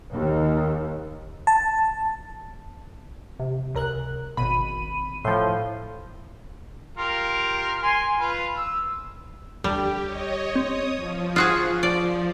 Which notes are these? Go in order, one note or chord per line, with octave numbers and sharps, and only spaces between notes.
D#2
A5
C3
C#2 A#4 F#6
G#1 B2 B5 D#7
A2 F3 C6 G6
F4 G4 A#4
G#5 C6
F4 B4
E6
D2 G3 G4
C#5 D#5
C4 C#5 D#6
F3
F4 F#4 G#4 D#6
D5